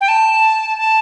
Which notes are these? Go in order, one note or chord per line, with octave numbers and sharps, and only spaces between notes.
G5
A5
A5